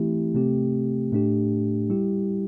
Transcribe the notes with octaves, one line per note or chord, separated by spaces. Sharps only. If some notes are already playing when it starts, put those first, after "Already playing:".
Already playing: E3 A3 C4 E4 G4
C3 A3 C4 G4
A2 A3 D4 G4
G3 E4 G4